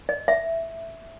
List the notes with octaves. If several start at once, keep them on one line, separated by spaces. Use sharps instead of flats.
D#5
E5